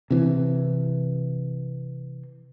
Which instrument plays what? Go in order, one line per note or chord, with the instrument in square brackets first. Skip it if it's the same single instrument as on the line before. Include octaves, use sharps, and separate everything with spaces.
[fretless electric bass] C3 E3 C4